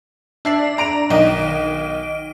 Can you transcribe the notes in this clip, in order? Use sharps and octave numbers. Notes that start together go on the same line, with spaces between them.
D4 D5 E5 C7
A#5 D7 F7
B1 D#3 D#5 D7